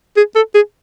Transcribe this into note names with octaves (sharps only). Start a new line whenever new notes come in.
G#4
A4
G#4